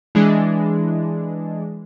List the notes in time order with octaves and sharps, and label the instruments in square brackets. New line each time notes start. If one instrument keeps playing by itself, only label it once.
[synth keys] E3 G#3 D4